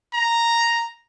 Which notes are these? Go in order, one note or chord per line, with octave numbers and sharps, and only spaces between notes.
A#5